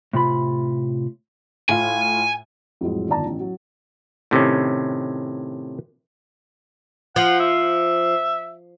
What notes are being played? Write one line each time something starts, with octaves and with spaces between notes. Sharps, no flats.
A2 C3 F4 B5
A2 F4 G#5
F2 A2 F#3 G#3
G1 D#3 F4 D5 A5 A#5
A1
F#3
A2 C3 D#3 C#4
F3 F#5
E5